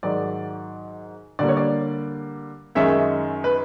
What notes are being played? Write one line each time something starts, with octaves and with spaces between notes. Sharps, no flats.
G#2 D#3 F#3 D5
D3 G3 A#3 D5
C#5
D5
F#2 D#3 G#3 C#4 E5
B4